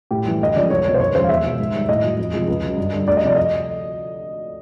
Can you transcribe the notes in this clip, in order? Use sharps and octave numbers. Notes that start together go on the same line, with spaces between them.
A2 G4
E3 G3
D2 D#5
C#3 F3 G#3 D5
C2 C#5
B2 G3 C#5
C5
D#2 C#5
C#3 F3 G#3 C5
F5
E2 E5
B2 G#3
G#2
D#3 G3
A2 D#5
F#3
F2
C3 F3 G#3
C#2
C#3 F#3
G2
D3 G3
D2 D5
D#5
C3 F3 D5
D#5